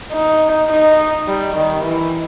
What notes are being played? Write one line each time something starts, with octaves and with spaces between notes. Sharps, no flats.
D#4
D#4
G3
D#3
E3